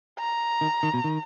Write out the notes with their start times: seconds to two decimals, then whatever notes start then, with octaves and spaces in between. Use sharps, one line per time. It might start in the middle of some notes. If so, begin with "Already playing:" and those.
0.19 A#5
0.61 D#3
0.83 D#3
0.94 B2
1.04 D#3